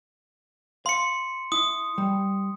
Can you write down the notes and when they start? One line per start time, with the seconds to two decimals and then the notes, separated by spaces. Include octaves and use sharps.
0.86 F5 C6 C#7
1.52 E4 D#6
1.98 G3